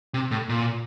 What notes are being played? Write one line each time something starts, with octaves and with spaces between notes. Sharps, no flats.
C3
A2
A#2